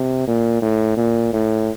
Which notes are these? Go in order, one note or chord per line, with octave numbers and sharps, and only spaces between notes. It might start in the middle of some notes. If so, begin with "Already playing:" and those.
Already playing: C3
A#2
A2
A#2
A2